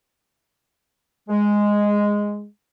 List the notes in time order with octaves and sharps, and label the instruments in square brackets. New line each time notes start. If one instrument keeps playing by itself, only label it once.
[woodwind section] G#3